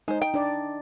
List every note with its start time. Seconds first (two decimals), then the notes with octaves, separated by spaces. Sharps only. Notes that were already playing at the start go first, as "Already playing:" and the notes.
0.08 G#3 D#4 C5
0.22 G5
0.34 D4 D5